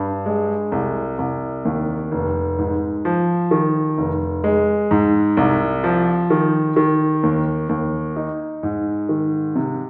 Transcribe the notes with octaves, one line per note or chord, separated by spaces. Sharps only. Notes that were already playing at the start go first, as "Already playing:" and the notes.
Already playing: G2
G#3
C2
C2
D#2
F1
G#2
F3
D#3
F1
G#3
G#2
C2
F3
D#3
D#3
D#2
D#2
D#4
G#2
D#3
C3